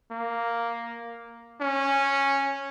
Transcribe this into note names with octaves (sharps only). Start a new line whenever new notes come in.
A#3
C#4